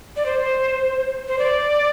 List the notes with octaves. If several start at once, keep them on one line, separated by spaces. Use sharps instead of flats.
D5
C5
C5
D5